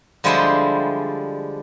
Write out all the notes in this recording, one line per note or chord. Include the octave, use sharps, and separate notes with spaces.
D3 F3 G3 G#3 E4 C5